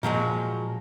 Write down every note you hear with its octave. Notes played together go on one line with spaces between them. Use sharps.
A#2 F3 F#3 G#3